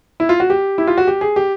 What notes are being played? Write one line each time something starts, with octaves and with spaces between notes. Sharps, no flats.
E4
F4
F#4
G4
E4
F4
F#4
G4
G#4
G4